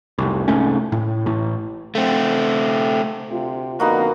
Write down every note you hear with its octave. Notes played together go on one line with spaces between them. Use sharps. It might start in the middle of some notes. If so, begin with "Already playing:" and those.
F1 C2
C2 G#2 A3 C#4
A2
A1 A2
A3 C4
D2 C3 F4
F2 D3 A#3 B3 D#4 F#4